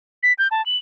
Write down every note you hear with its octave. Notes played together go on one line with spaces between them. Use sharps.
B6
G6
A5
F#7